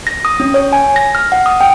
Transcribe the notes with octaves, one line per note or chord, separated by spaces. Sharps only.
A#6
D#6
C#4
C#5
G#5
A#6
F6
F#5
D#6
G5